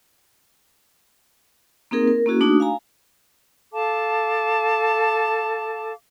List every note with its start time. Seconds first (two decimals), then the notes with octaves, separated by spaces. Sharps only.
1.91 A#3 C4 D#4 G#4 A#4
2.08 A#4
2.26 A#3 C#4 E4 F#4 G#4
2.41 A3 D4 D#4 F#4 D#6
2.60 F5 G#5 A#5
3.72 A4 F5 A5 D6